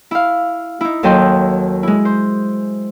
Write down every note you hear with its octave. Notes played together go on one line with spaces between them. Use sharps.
E4 F5
D#4 E4
D#2 F#3 A4 D#5 G5 C6
G#3 E4
C5